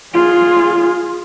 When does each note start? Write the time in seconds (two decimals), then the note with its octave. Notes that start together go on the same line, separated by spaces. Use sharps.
0.14 F4 G#4